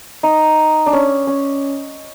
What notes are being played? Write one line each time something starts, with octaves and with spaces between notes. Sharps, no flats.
D#4
D4
C#4
C#4